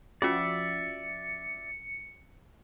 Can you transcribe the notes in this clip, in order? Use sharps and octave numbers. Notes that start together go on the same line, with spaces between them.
F3 C#4 F4 F#4 D5 E5 C#7